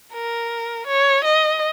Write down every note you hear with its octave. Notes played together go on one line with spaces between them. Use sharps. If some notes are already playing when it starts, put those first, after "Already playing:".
A#4
C#5
D#5